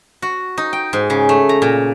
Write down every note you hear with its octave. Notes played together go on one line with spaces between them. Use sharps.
F#4
D#4
G5
G#2
C#3
A3
A#5
A#2